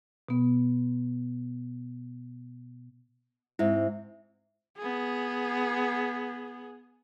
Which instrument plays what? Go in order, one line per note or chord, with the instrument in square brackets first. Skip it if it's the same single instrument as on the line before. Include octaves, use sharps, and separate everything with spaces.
[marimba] B2 B3
[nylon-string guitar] G#2 C4 [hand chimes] E4 E5
[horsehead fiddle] B3 G#4